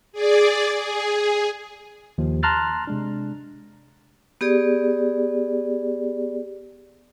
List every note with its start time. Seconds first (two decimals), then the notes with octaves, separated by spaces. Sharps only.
0.12 G#4 D5
0.79 G#4
2.18 D#2 F3
2.43 A5 A#5 C6 F6 F#6 A6
2.87 C3 G#3 D4
4.41 B3 G4 G#4 D5